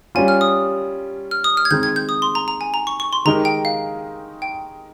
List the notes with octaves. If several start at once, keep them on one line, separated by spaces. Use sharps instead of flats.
G3 C#4 F4 G#5
F6
D#6
F6
D#6
F6
G#6
D#3 G#3 C4 G6
G#6
G6
D#6
C6
A#5
A#5
G#5
A#5
C#6
C#6
C6
D#3 G#3 D#4 G4 A#4 A#5
G5
F5
G5